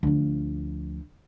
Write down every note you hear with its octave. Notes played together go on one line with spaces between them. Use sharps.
D2 F3